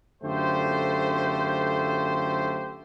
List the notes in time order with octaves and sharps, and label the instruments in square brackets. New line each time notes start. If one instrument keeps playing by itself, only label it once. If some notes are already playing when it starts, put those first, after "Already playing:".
[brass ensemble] F#2 D3 A3 F4 G4 C5